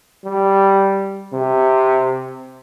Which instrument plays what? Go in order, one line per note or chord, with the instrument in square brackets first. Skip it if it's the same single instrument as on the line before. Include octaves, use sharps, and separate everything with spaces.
[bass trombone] G3
C3